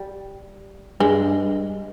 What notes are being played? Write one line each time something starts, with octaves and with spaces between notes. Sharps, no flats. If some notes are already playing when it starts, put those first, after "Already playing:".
Already playing: G3
G2 G#3